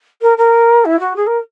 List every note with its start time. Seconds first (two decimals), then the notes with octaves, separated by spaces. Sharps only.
0.21 A#4
0.37 A#4
0.85 E4
0.99 F#4
1.16 G#4
1.26 A#4